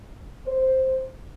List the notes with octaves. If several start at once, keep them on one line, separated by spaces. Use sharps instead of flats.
C5